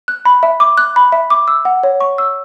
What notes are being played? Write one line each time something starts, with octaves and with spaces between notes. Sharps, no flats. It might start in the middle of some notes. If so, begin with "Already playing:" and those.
F#6
B5
E5
D6
F#6
B5
E5
D6
E6
F#5
C#5
C#6
E6